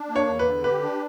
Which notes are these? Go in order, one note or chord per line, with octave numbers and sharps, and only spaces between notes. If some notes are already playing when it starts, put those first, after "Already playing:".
Already playing: D4
A#3
C#5
E2
B4
D3
G4 B4
D4